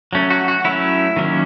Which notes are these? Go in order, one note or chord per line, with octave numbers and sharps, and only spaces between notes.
F#3 A3 C#4
F#4
F#4
F#3 A3 C#4 E4
D#3 F#3 A#3 C#4